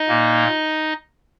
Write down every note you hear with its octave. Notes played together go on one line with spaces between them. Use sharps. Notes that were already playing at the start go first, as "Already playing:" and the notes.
Already playing: D#4 D#5
A#2 A#3